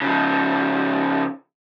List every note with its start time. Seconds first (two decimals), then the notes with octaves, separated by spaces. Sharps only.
0.02 C#3 F3